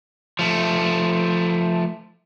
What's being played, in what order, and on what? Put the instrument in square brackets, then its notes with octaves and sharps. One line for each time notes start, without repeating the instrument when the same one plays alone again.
[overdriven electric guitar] F3 A3